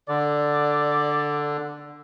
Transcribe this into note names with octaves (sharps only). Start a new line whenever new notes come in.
D3 D5